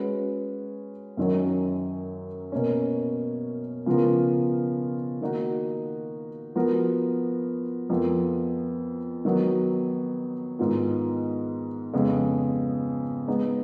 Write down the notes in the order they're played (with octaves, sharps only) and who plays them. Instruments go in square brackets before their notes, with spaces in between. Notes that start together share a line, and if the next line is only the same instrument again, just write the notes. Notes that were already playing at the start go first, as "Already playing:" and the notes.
Already playing: [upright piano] G#3 C#4 F#4 B4
F#2 D#3 F#3 C#4
B2 A#3 C#4
C#3 F3 B3 F4 A#4
D#3 A#3 D#4 F#4
F3 B3 F#4 A#4
F2 F3 B3 F4 A#4
D#3 F#3 B3 F#4
G#2 D#3 G#3 B3 F4
F2 C#3 G#3 B3
G#3 B3 D#4